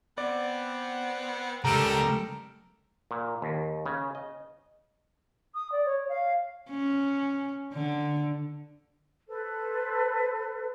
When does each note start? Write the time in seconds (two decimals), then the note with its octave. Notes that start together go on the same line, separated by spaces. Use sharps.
0.18 B3 C4 D5
1.65 C#3 G3 G#3 G4 A4 A#4 A#5 D7
3.11 A#2
3.42 D#2
3.86 C#3
4.15 D#5
5.55 D#6
5.72 D5
5.86 C#5
6.09 F5
6.70 C#4
7.74 D3
9.29 A4 B4 C5